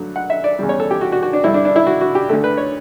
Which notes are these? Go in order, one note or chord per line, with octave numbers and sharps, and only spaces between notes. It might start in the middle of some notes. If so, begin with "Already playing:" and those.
Already playing: G2 D3 F#3 A3
F#5
E5
D5
E2 C#3 G3
C#5
A4
G4
F#4
F#4
F#4
D4
G2 D3 G3 E4
D4
D4
E4
F#4
F#4
G4
D2 D3 A3 A4
B4
C#5